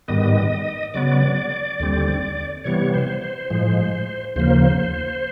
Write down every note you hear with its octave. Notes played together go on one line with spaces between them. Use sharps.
G#2 D#3 G3 B3 D#5
C#3 F#3 B3 D5
D#2 D3 G3 C4
C3 E3 G3 B3 C#5
C5
C5
A2 F3 G#3
D#2 C#3 F3 A#3 C5